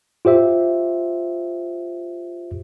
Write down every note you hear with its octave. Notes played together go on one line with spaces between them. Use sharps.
F4 G4 C5 E5